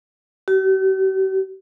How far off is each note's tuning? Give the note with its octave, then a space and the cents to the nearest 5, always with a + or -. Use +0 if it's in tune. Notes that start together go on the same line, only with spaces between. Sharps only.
G4 -45